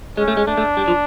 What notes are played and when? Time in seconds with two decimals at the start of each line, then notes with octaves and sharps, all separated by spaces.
0.17 G#3 C#4
0.28 A3
0.37 G#3
0.47 A3 D4
0.57 A3
0.77 G3
0.88 F3